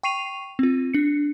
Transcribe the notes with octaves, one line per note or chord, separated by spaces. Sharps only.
G5 C#6 C7 D#7 F7
C4 F4
D4 C#7